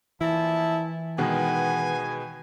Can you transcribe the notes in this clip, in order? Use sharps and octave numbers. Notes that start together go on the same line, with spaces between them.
A#2 E3 F3 E4 A5
B2 D#3 G#3 B3 B4 G#5